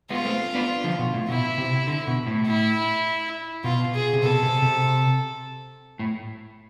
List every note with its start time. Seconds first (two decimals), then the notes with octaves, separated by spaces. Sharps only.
0.10 G#3 B3 F4
0.25 A3 C4
0.55 B3 D4
0.84 D3 F3
0.99 B2
1.14 A2
1.29 B2 E4
1.58 C3
1.87 D3
2.07 B2
2.27 A2
2.47 E4
3.64 B2 F4
3.94 G#4
4.13 C3
4.23 B2 A4
4.43 C3
4.62 C3
5.99 A2